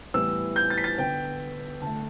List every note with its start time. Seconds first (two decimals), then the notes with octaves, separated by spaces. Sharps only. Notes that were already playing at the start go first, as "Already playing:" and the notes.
0.14 A2 E3 G3 B3 E6
0.56 G6
0.70 A6
0.78 B6
0.84 A6
0.98 D3 B3 G5
1.82 D3 A3 A5